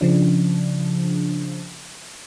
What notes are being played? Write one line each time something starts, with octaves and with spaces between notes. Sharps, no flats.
C#3 F3 D4